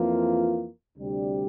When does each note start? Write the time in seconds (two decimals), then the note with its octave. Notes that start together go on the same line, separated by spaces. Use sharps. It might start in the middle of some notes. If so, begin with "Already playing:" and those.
Already playing: F2 E3 A#3 F4
0.97 D2 C3 G3 D4 G4